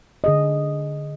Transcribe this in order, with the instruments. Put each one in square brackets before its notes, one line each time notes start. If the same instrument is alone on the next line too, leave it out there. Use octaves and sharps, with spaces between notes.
[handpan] D3 G#4 D#5